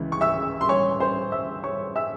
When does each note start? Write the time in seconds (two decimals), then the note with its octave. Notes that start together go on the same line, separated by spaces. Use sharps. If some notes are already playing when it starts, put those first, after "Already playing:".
Already playing: C#2 C#3 E3
0.12 C#6
0.21 E5 E6
0.61 C6
0.69 C#5 C#6
1.00 C5 C6
1.32 E5 E6
1.64 C#5 C#6
1.96 E5 E6